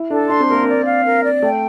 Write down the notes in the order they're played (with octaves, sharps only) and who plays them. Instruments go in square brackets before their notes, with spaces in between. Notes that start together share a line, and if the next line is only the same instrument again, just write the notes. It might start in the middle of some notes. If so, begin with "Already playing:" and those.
Already playing: [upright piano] E4
[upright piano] D4 [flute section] A4
[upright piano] D4 [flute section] C6
[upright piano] C4
[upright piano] A#3 [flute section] A#4
[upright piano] C4 [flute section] D5
[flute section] F5
A#4
D5
[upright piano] A3 [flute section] G5